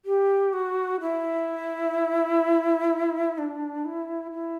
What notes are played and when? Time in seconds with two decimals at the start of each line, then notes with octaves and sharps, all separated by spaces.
0.05 G4
0.53 F#4
1.01 E4
3.38 D4
3.85 E4
4.32 E4